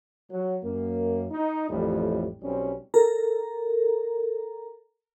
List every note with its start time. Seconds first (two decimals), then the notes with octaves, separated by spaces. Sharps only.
0.31 F#3
0.63 F#2 A#3
1.31 D#4
1.70 A1 F2 A2 G3
2.42 B1 G3 C4 C#4
2.94 A4 A#4 A#5